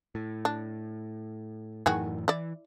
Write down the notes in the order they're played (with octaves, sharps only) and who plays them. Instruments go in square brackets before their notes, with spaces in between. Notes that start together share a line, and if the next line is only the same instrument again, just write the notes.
[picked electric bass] A2
[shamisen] D4
[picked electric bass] F#2 A2 E3 [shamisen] D#3 F#4 G#4
[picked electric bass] E3 [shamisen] E4 D5